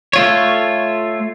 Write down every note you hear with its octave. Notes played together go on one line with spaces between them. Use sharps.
A3 F4 C#5